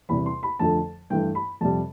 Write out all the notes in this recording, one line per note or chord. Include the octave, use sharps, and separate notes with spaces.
E2 C3 G3 B5
C6
B5
F2 D3 F3 A3 A5
G2 E3 A3 G5
B5
F2 C3 G3 A5